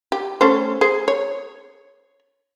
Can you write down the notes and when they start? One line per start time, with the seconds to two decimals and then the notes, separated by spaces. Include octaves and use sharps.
0.12 G4
0.41 A3 C#4 C5
0.81 G#4 C5
1.08 C#5